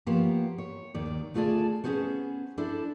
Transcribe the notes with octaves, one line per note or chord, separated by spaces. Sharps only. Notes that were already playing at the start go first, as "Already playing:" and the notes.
F3 A#3 B3 G4 C5 C#5
C#5
D#2 D#3 D5
D2 A3 F4 G#4 D5 A5
B3 C#4 F4 G#4 C5 C#5
D4 E4 A4 C5